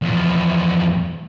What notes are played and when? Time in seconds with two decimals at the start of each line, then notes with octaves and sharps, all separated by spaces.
0.02 E2 F3